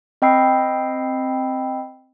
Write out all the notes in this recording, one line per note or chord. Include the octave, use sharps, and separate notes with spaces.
C4 D#5 G5 B5 E6 C7